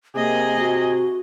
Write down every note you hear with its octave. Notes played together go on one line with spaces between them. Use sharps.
C3 A#3 G#4 D#5
F#4